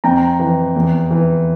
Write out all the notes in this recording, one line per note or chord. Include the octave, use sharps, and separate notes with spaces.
F2 G5 A#5
E3
E2
E3